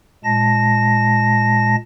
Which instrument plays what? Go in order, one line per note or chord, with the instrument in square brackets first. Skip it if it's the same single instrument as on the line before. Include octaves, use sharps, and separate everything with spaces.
[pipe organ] A#2 G#3 A5 A#6